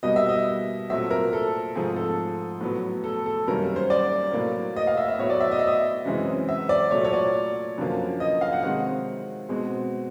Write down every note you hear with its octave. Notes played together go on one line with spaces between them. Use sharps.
B2 G3 A#3 D#5
E5
D#5
A#2 F#3 A3 C4 E5
A#4
A4
G#2 F3 A3 C4 G#4
A4
A2 F#3 B3
A4
A4
F#2 D#3 G3 A#3 A#4
C5
D5
A2 F#3 A#3
D#5
F5
E5
E5
A2 F#3 B3 C#5
D5
E5
D#5
E5
D#5
F#2 C#3 E3 G#3 C4
E5
D5
A#2 F#3 A3 C#5
C#5
D5
F#2 D3 F3 A#3
D#5
F5
F#5
C3 D#3 G#3 C4 F#5
B2 G#3 C4